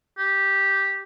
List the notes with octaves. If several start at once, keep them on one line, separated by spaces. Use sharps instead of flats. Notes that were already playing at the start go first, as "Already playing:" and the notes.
G4